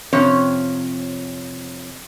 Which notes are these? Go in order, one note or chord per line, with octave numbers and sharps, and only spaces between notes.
F2 C3 C#4 C#5